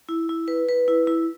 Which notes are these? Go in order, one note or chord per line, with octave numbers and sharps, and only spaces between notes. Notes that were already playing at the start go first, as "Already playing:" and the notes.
E4
E4
B4
B4
E4
E4